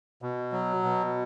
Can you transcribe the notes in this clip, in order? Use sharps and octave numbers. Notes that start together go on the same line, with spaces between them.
B2
F#3
B2